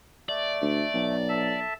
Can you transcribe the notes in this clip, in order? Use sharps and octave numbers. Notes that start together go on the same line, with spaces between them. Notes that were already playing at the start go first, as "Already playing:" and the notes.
A3 D5
D2
B1
A4 E5 A5